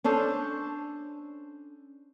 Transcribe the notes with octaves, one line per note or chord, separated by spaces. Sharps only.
C#4 D4 A4 C5